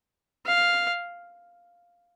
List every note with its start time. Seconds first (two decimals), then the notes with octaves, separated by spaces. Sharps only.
0.46 F5